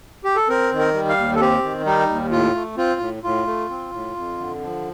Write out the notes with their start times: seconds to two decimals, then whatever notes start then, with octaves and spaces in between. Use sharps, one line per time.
0.25 G4
0.36 A4
0.49 C4 A#4
0.72 D#3
0.79 A#4
0.94 G3
1.09 F5
1.18 D#2
1.36 A4
1.41 C4 G4
1.63 D#3
1.86 G3 D#4
2.09 D#2
2.31 A2 F4
2.55 A3
2.77 C4 F4
3.00 A2
3.23 A2 F4
3.46 A3
3.70 C4
3.92 A2
4.16 F2
4.38 D3
4.62 F3